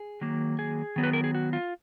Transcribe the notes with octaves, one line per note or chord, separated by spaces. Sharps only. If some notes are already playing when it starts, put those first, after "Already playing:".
Already playing: G#4
D#3 F#3 A#3
G#4
D#3 F#3 B3
B4
A#4
G#4
F#4
F4